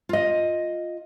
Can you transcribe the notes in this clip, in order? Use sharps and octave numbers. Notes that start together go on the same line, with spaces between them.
F4 D#5